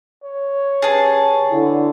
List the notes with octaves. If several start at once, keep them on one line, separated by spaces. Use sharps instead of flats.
C#5
C#3 G4 G#4 B4 A5
D3 E4